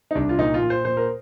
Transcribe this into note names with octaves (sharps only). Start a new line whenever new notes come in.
D#4
C2 D4
F4
A#2 D#4
F4
A#2
C5
A#2 C5
A#4